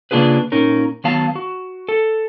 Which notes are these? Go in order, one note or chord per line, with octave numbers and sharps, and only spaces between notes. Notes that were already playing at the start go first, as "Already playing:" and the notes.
C#3 A#3 D4 F4 G#4 B4
A#2 C#4 D#4 A#4
D#3 F#3 B3 F5 A5
F#4
A4